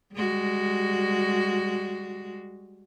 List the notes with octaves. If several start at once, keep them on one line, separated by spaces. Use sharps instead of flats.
G3 G#3 F#4